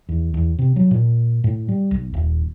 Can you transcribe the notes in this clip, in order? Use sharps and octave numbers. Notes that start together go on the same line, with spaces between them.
E2
E2
C3
F#3
A#2
A2
G3
B1
D#1